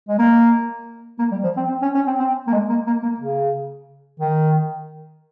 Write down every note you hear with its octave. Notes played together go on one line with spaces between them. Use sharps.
G#3
A#3
A#3
G3
F3
C4
C4
C#4
C#4
C4
C4
A#3
G#3
A#3
A#3
A#3
C#3
D#3